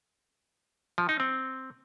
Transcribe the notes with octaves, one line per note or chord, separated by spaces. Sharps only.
F3
D#4
C4